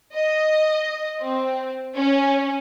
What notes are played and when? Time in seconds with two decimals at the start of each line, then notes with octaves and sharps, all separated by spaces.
0.15 D#5
1.21 C4
1.96 C#4